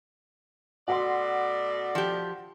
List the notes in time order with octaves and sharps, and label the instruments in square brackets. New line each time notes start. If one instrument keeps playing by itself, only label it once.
[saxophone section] B2 A3 D5 [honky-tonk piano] F#4 F#5 C6
[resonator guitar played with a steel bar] F3 G4